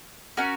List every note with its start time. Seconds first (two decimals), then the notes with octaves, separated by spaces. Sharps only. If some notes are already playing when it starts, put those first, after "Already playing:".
0.37 C#4 F#4 A#4